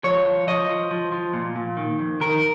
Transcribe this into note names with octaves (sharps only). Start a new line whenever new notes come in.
F3 C#5
F3
F3 D#5
F3
F3
F3
A#2
A#2
D#3
F2
D#3 A#4